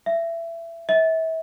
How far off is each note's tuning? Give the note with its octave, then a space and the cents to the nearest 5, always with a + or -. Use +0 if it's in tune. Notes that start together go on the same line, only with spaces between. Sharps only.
E5 +20
E5 -35